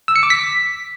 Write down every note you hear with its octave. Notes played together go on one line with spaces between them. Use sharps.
E6
C#7
D6
B6